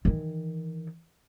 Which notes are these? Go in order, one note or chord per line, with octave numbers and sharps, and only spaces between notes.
D#3 E3